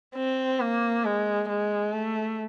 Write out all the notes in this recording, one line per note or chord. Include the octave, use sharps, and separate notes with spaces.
C4
A#3
G#3
G#3
A3